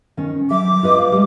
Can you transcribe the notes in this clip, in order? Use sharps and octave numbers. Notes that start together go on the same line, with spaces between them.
D#3 C#4
F#3 E5 D6
F4 B4 D#5
F5
G3 G#3